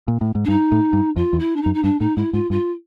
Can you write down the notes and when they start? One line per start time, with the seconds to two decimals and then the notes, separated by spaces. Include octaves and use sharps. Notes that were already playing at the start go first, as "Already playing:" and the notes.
0.08 A#2
0.21 A2
0.35 G#2
0.44 D4
0.48 G2 D#4
0.72 A2
0.93 G2
1.16 F2 F4
1.33 E2
1.39 E4
1.56 D4
1.61 D#4
1.66 F#2
1.73 D#4
1.83 G2 D4
1.99 A2 D#4
2.16 G#2 E4
2.33 G#2 F4
2.50 G2 F4